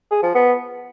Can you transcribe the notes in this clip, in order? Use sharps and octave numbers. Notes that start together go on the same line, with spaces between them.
G#4
F3
B3